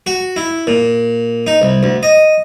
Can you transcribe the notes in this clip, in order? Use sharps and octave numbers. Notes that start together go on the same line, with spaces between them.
F#4
E4
A#2
D#4
C2
D2
D#5